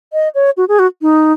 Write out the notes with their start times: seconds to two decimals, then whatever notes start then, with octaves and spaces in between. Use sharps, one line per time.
0.13 D#5
0.35 C#5
0.57 F#4
0.68 G#4
0.79 F#4
1.02 D#4